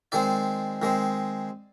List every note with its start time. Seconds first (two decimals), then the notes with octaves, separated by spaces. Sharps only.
0.12 D#3 G#3 C4 D5
0.82 D#3 G#3 C4